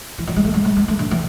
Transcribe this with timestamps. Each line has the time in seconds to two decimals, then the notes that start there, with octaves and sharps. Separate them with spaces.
0.18 E3
0.27 F3
0.36 G#3
0.45 A3
0.54 G#3
0.65 G#3
0.77 G#3
0.88 A3
0.99 D3
1.11 E3